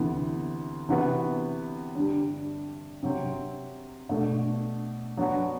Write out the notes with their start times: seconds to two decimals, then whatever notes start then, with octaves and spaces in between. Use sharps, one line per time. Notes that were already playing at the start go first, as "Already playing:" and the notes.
Already playing: D2 C3 E3 B3
0.89 C3 E3 B3 F#4 B4
1.95 G2 D3 G3
3.03 C3 F#3 C4
4.09 B2 A3 D4
5.17 F#3 B3 D4 F#4